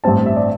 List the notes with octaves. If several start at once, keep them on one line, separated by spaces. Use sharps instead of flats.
A1 G2 G3 C4 A5
E5
D5